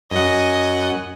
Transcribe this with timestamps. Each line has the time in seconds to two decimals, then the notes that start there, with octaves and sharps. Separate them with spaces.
0.11 F#2 D#5 F#5 G#5